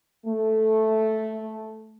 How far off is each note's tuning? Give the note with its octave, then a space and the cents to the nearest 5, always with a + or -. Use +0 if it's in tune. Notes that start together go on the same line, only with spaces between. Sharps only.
A3 -5